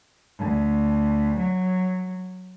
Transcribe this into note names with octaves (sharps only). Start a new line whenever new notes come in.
D2
F#3